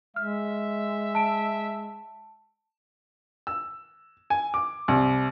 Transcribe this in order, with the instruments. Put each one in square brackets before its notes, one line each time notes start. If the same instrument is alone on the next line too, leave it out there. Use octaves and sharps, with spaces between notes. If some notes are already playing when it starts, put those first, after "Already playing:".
[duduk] G#3 [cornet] E5 [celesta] F6
[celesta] A5 D7
[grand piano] E6
G#5
D6
C2